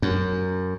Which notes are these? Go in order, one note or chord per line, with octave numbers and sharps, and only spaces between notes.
F#2